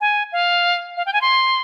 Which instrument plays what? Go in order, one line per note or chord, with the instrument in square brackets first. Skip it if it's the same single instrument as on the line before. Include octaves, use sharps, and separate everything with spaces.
[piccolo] G#5
F5
F5
G5
G#5
C6